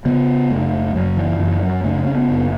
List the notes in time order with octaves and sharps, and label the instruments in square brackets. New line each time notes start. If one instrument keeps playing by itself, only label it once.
[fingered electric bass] C#3 B3
F#1 A3
F#1 F#3
E3
F#2 E3
F#3
C#3 A3
C#4
B3
F#1